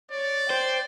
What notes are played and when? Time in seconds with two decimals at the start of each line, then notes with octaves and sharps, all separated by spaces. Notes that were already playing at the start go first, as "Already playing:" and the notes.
0.11 C#5 D5
0.50 C5 G5